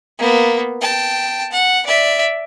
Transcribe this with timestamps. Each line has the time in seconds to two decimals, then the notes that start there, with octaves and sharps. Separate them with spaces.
0.19 A#3 B3
0.81 G5 A5
1.51 F#5
1.86 D5 E5